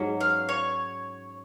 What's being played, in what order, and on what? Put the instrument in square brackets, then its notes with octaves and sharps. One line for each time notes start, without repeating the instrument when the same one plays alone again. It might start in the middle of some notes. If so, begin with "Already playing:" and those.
Already playing: [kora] G#2 F#3 C#4
[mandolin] F5
C#5